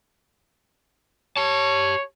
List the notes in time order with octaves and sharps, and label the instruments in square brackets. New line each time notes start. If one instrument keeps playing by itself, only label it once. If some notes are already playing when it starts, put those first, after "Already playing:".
[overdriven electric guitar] G4 A5 [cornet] C#5